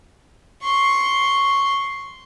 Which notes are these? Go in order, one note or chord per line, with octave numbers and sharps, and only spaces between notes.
C6 C#6